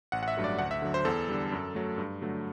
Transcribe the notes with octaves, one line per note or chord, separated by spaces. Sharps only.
A1 F#5
F#5
E5
G2 F#3 A3
D5
D2 F#5
E5
D3 F#3
C5
E2 A4
D3 G3
F#2
F#3 A3
G2
D3 F#3 A3